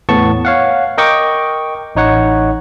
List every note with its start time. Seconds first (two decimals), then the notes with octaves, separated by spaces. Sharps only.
0.09 E2 A2 B3 A5 C#6
0.45 C#5 F5 F#5
0.98 A#4 D#5 G5 C#6 D6
1.95 A1 D#4 C#5 F#5